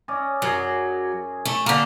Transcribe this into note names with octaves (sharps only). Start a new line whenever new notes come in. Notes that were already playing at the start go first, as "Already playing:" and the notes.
C#4 D5 D#5
F#2 F#3 G#4
A3
D3 A#3 A5 A#5